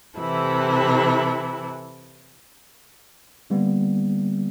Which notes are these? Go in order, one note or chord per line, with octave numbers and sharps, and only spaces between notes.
C3 E3 E4 A4
D3 G3 A#3 B3